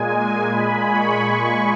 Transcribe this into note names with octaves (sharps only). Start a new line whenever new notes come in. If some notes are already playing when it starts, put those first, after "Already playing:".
Already playing: A#2 G#3 G#5
B5
C#6